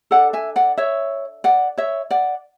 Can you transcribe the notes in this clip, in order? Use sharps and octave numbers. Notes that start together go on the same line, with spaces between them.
D4 A4 D5 F#5
E5 G#5
D5 F#5
C#5 E5
D5 F#5
C#5 E5
D5 F#5